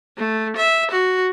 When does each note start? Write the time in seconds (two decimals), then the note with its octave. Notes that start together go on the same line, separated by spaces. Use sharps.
0.17 A3
0.57 E5
0.91 F#4